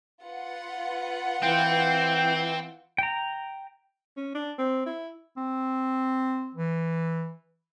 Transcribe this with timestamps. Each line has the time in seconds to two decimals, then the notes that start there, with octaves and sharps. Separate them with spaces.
0.22 F4 B4 F#5
1.43 E3 C4 G5
2.98 G5 A#5
4.17 C#4
4.35 D4
4.59 C4
4.86 E4
5.37 C4
6.55 E3